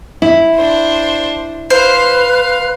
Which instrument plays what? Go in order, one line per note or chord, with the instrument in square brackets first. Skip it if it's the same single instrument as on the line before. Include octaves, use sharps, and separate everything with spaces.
[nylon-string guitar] E4
[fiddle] D4 C5
[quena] B4 [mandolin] C5 [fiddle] F5